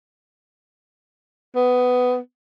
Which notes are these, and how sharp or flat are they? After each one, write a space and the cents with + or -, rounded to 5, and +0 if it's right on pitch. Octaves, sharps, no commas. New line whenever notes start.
B3 +15